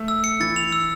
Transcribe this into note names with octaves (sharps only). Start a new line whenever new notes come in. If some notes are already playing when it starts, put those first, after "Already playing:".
Already playing: A3
E6
C#7
E3 A6
F7
E6